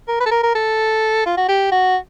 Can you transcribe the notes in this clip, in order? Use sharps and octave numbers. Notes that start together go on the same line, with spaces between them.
A#4
B4
A4
A#4
A#4
A4
F4
F#4
G4
F#4